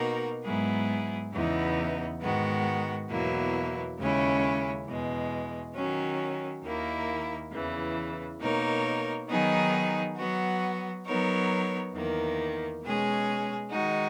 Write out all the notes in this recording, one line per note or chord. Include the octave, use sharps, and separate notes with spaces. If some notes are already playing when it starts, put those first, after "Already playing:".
Already playing: B2 A#3 D#4 F#4 A#4
G#2 F#3 B3 E4 G#4
E2 C#3 E3 B3 D#4
G#2 D#3 G#3 B3 F#4
E2 B2 F#3 A#3 E4
D#2 C#3 G#3 C#4 E4
E2 B2 G#3
D#3 F#3 C#4
D#2 D#3 A#3 E4
E2 C#3 E3
B2 A#3 D#4 A#4 C#5
D#3 F#3 B3 D#4 G#4
F#3 B3 F#4
F#3 B3 D#4 A#4 C#5
E2 D#3 A#3
B2 G#3 C#4 G#4
D#3 G#3 D#4 F#4